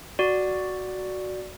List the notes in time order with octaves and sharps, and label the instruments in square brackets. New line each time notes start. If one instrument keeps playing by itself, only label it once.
[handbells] F#4 D5